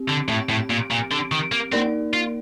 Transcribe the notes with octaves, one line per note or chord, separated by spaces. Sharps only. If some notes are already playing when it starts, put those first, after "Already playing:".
Already playing: C4 G4
D3
A2
A2
A#2
A#2
D3
D#3
A#3
A#3 C4 D#4 A#4 D5
F4